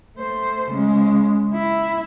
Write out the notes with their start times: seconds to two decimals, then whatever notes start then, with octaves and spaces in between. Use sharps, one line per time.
0.17 A3 C5
0.70 C#3 G#3
1.53 E4